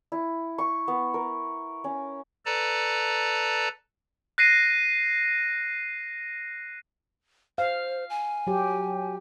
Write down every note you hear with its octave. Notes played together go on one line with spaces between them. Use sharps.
E4
C#6
B3
A#4
C#4
A4 B4 D5 A5 A#5
F#6 A#6 C7 D#7
C5 F5
G#5
F#3 G4